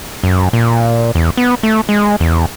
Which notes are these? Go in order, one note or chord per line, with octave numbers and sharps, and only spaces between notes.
F#2
A#2
E2
B3
A3
G#3
E2